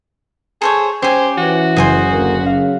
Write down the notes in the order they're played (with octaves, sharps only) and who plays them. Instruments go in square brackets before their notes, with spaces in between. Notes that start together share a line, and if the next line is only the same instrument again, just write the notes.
[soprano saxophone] G#4 [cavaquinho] A4 C5 C#5
[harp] C#4 [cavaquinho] G4 G#5 [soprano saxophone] C5
[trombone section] E3 [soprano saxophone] F#4
[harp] F#1 [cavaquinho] C5 G#5 D#6
[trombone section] D2 A#3
[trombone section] C#3 [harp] F5 F#5 B6